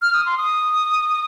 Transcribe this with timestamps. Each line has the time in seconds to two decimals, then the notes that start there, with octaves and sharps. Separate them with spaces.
0.02 F6
0.14 D#6
0.26 C6
0.37 D#6